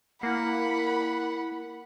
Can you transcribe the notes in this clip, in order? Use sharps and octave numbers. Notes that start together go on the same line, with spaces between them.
A#3 E4 F#5 B5